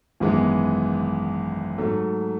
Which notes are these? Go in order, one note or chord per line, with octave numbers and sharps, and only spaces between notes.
G#1 F#2 E3 G#3 B3
G#2 F#3 A3